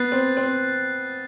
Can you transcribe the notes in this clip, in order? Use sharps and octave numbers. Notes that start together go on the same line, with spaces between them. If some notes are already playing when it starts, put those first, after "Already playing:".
Already playing: B3 F#6 A6 C7
C4
C4